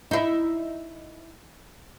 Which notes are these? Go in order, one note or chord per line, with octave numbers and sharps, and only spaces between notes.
D#4 E4